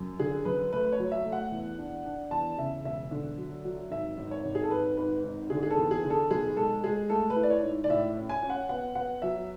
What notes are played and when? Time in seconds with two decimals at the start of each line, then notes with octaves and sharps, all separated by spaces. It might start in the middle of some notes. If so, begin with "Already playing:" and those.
Already playing: F#2
0.19 D3 G#4
0.45 F#2 B4
0.73 A3 B4
0.92 C#5
0.99 F#3
1.12 E5
1.25 A3
1.32 F#5
1.51 E2
1.78 D4
2.06 D4
2.31 E2 A5
2.58 C#3 E5
2.84 E1 E5
3.11 D3
3.38 F#3
3.64 F#3
3.91 G#1 E5
4.18 G#1
4.31 C#5
4.45 G#1
4.55 G#4
4.63 A4
4.71 G#1 B4
4.97 G#2 B4
5.24 G#1
5.50 D3 G#4
5.63 G#4
5.71 A4
5.77 E2
5.91 G#4
6.04 D3
6.10 A4
6.31 B1 G#4
6.57 G#3 A4
6.84 G#3 G#4
7.10 A3 A4
7.30 B4
7.36 E4
7.43 D5
7.50 C#5
7.63 G#2
7.84 D5
7.89 A2 E5
8.17 C#4
8.29 G#5
8.43 C#4
8.50 F#5
8.69 B3 F#5
8.95 B3 F#5
9.22 F#3 E5